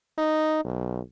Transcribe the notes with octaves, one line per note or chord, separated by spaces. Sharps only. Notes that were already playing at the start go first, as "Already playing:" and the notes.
D#4
B1